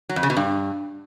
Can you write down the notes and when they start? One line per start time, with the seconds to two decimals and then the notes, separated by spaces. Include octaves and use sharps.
0.09 F#3
0.16 F2
0.23 C#3
0.30 B2
0.37 G2